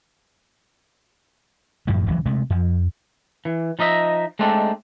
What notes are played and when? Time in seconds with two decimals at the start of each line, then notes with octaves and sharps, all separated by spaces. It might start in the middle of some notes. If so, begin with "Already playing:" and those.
1.87 F#2 A2 D#3 F3
2.07 D1 C#2 E3 F#3
2.26 C3 G#3 A3
2.50 F2 F3
3.45 E3
3.79 F3 D#4 D#5 E5
4.39 G#3 A3 C4 D4 D#4 A4